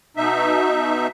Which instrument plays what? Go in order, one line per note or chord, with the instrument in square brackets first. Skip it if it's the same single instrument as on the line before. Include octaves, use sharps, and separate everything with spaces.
[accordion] B2 D#4 E5